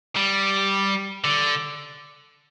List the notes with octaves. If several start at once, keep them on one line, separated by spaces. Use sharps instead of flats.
G3
D3